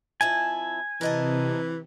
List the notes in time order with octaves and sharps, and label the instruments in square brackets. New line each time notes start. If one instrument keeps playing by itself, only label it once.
[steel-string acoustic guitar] F2 E4 A5 [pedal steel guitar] G#5
[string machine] C3 [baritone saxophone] E3 [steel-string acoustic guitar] A#4 D#5 A5